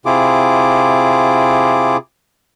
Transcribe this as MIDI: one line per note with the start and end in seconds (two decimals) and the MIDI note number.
0.06 1.97 48
0.06 1.97 64
0.06 1.97 65
0.06 1.97 68
0.06 1.97 86